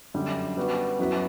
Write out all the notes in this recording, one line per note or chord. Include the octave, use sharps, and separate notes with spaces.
F#2 D3 G3
G3 B3 F#4
F#2 F#3 B3 E4 B4